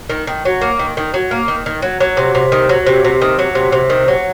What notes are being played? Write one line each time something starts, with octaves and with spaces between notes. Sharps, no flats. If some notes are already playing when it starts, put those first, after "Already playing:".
D#3
D#3
F#3
A#3
D#3
D#3
F#3
A#3
D#3
D#3
F#3
F#3
C3
C3
D#3
F#3
C3
C3
D#3
F#3
C3
C3
D#3
F#3